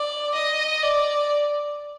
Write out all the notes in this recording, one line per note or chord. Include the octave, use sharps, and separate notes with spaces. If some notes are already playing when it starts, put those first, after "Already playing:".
Already playing: D5
D#5
D5